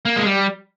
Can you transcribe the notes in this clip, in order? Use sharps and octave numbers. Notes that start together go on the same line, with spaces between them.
A#3
G#3
G3